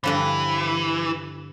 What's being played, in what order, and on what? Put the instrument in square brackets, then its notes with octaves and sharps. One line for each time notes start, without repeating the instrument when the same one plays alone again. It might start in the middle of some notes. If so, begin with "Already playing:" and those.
[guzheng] G2 D3 F3 [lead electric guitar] E3